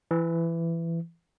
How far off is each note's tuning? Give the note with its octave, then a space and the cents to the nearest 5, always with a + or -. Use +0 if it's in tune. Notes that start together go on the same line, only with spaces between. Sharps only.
E3 +20